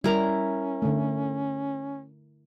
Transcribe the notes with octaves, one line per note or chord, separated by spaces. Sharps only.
G3 C#4 E4 A#4 A#5
D3 A3